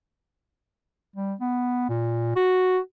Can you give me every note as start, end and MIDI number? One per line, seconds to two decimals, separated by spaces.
1.16 1.34 55
1.40 1.88 59
1.89 2.32 46
2.36 2.78 66